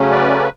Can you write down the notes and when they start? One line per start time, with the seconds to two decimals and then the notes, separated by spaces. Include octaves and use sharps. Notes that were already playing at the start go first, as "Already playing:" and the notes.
Already playing: C#3 F#3 A3 C#4
0.11 B4 D5